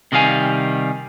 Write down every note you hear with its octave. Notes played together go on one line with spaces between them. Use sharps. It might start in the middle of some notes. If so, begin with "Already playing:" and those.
C3 D#3 G3 F5 G#5